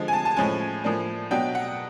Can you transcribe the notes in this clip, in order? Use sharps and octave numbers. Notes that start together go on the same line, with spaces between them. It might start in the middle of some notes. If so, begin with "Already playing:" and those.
Already playing: D3 F3 G#3
G#5
A5
A5
A2 F3 G#3 C#4 G#5
A2 F3 A#3 D4
B2 F#3 B3 D4 G5
F#5